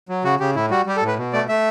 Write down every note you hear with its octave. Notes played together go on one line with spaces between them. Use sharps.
F#3
C#3 F#4
C#3 G4
A2 E4
G3 F#4
G3 G4
A4
A2
B4
B2
A3 D5
A3 E5